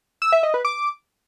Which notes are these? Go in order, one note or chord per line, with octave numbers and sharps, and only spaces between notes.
E6
E5
D#5
B4
D6